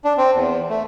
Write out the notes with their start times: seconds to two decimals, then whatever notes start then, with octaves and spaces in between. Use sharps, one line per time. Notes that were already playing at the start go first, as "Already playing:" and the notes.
0.05 D4
0.18 C4
0.35 E2
0.70 A3